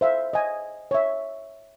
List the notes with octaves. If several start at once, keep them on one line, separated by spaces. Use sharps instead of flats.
C5 E5 F5
D#5 G#5
C#5 E5